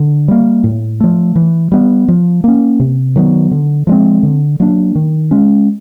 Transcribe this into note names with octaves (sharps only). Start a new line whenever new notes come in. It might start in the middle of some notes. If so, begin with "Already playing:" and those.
Already playing: D3
G3 A#3
A2
F3 A3
E3
G3 B3
F3
A#3 C#4
C3
D#3 F#3 B3
D3
F3 G#3 C4
D3
F#3 A#3 D4
D#3
G#3 C#4